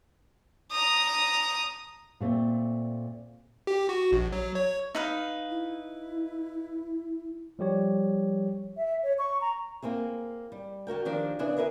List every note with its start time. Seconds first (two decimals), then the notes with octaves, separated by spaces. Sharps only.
0.72 A#5 D#6
2.20 A#2 A3 C4
3.67 G4
3.89 F#4
4.12 A#1
4.32 F#3
4.55 C#5
4.95 D#4 B4 F5
5.51 E4
7.59 F3 G3 G4 C#5
8.77 E5
9.03 C#5
9.18 C#6
9.41 A#5
9.83 A#3 C4 E4 G#4
10.52 G3
10.87 D3 F#4 A#4 G5
11.05 D#3 F3 D4 G4 A#4
11.39 C#3 B3 D4 E4 G#4 C5
11.58 G#4 A#4 B4 E5